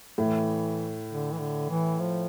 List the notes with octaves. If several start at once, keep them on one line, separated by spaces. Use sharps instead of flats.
A2 E3
D3
E3
D3
E3
F3